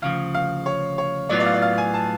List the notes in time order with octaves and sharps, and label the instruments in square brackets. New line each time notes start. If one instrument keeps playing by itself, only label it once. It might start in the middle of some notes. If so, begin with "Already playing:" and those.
[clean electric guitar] D2 C#3 F3 [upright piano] F5
[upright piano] F5
C#5
C#5
[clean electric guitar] A2 F#3 B3 F4 [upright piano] D5
[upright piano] D5
F5
D5
F5
G#5
A5